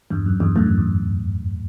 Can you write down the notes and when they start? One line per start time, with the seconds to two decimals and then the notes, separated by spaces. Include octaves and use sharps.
0.10 E2 G2
0.26 F#2
0.40 E2 G2
0.56 F#2 A2
0.66 F#2
0.78 E2